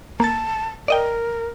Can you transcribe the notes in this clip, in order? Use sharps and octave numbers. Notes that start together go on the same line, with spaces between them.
A#3 A5 A6
A#4 D5 D#5 G5